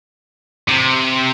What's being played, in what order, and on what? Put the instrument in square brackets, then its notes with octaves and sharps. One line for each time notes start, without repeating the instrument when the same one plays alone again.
[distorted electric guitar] C3